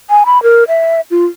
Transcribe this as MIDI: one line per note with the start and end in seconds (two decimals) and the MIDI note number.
0.10 0.24 80
0.26 0.41 83
0.43 0.64 70
0.68 1.01 76
1.11 1.26 65